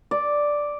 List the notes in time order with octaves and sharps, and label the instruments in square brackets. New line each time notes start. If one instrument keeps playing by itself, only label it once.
[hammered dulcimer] D5